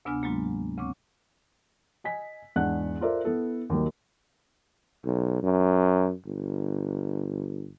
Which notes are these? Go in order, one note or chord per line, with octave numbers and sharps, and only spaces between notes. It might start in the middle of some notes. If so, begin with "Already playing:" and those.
D2 C3 B3 D4 G#5 F6
G#2 F#3 G#3 A#3 F4
G#3
D2 C#3 C4 C#6 D6
D#5 G#5 B6
E2 G#2 D4 F#5 F#6
F4 A4 A#4 C5 D5 E5
B3 E4 A4
D#2 D#3 F#3 G3 A#3
B1
F#2
G1